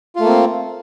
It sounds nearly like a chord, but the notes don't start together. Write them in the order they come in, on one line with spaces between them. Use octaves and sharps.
F4 A3 A#3 C4